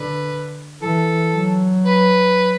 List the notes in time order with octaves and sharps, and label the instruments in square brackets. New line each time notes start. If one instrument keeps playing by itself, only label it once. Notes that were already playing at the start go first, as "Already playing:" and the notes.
Already playing: [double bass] D3 [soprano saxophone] B4
[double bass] E3 [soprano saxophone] A4
[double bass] F#3
[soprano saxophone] B4